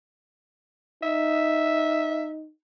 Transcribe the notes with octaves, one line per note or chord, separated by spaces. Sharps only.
D#4 E5